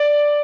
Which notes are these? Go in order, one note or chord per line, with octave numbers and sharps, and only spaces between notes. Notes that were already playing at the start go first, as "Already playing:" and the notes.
Already playing: D5